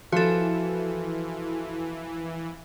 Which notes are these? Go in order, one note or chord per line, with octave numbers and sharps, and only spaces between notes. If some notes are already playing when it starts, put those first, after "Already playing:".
E3 F3 F#4 A4